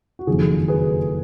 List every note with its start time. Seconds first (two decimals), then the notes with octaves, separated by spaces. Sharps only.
0.19 F#4
0.27 F#1 F2 D#3 G#4
0.68 G#4 B4